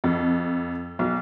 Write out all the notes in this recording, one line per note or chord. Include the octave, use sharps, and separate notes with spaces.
F2
B1